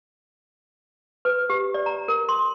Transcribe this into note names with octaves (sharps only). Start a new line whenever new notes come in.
B4
G4
D5
A#5
A#4
C6